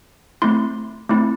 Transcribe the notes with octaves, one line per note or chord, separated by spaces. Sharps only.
A3 C4 E4 C6
A3 C4 E4